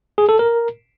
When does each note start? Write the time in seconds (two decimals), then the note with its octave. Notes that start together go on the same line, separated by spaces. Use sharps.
0.18 G#4
0.29 A4
0.39 A#4